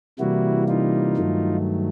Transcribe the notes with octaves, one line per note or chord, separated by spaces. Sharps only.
C3 E3 G3 A#3 E4 F#4
D#4 F4
G2 D#3 F#3 A3